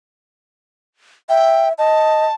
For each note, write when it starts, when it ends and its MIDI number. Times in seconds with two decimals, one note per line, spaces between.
1.29 1.73 76
1.29 1.69 79
1.78 2.26 75
1.78 2.34 81